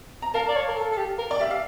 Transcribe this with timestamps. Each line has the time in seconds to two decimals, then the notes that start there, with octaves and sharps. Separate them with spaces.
0.22 A#5
0.34 A#4 F5 A5
0.48 D5
0.56 C#5
0.68 A#4
0.77 A4
0.91 A4
0.97 G4
1.18 A#4
1.31 D5
1.39 G4 E5
1.51 F5